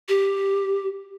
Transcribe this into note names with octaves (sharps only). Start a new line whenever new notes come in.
G4